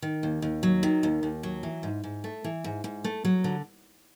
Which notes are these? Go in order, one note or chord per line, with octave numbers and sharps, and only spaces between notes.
D#3
D#2
D#2
F#3
D#3
D#2
D#2
F#3
E3
G#2
G#2
A3
E3
G#2
G#2
A3
F#3
D3